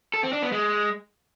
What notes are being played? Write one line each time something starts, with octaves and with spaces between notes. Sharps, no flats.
A4
C4
D4
B3
G#3